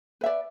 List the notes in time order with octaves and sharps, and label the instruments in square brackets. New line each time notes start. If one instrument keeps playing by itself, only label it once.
[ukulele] B4
E5
D5